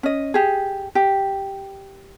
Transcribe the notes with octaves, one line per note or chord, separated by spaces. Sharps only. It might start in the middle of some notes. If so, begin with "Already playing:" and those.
C#4 D#5
G4 G#4
G4